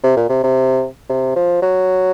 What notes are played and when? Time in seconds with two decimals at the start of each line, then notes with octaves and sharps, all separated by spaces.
0.04 C3
0.17 A#2
0.29 C3
0.44 C3
1.09 C3
1.36 F3
1.62 F#3